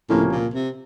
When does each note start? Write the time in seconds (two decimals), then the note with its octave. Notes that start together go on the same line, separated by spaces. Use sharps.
0.09 C#2 A2 C3 F3 A#3 C#4
0.32 A#2
0.54 C3